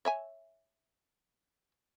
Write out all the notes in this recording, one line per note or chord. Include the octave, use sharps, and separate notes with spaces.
C#5 E5 G#5